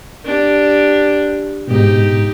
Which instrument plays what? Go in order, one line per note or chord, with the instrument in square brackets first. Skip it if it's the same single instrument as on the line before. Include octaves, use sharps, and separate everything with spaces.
[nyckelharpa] D4 G4
[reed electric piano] G#2 B2 [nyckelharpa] D#4 G4